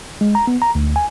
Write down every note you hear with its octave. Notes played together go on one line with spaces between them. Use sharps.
G#3
A#5
B3
A#5
D2
G#5